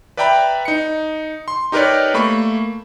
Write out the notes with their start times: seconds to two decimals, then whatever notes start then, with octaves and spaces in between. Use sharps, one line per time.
0.17 B4 D5 E5 G5 A#5 B5
0.65 D#4 C#7
1.48 C6
1.72 D#4 G4 A#4 B4 C#5 D5
2.14 A3 A#3 B5 C#6